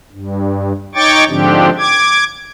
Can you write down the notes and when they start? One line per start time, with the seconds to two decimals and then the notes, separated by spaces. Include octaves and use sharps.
0.12 G2
0.95 D#4 C#5 G5 C#6 D6 A6
1.28 G#2 D3 F3 C4 D4 G4
1.79 D6 G#6